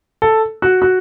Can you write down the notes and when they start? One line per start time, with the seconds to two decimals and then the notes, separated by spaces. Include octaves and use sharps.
0.22 A4
0.62 F#4
0.82 F#4